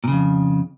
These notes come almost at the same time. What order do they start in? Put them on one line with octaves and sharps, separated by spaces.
A#2 C#3 F2